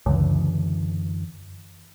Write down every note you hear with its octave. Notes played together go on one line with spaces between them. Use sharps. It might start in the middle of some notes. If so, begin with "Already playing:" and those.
C#2 F#2 D3 E3